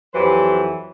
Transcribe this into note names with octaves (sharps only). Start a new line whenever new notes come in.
F2 E3 F#3 G4 B4 C5